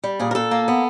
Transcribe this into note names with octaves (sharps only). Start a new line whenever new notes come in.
G3
A#2 G#4
A#4
A#2 A4
A#3
B3